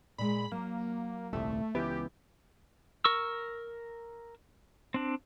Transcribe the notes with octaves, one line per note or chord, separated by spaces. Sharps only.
A#2 G#3 B5
F#3 A#3
D#1 C2 A3 E5
C#2 E3 B3 G4
A#4 C#6 E6
C4 D4